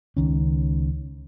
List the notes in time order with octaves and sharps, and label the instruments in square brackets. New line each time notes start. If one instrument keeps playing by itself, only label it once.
[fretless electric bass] C#2 D#3 C#4